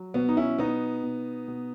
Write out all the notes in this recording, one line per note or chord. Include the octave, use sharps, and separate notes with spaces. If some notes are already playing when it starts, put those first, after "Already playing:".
Already playing: F#3
B2 B3
D#4
C#4 E4
B2 B3 D#4
B2
B2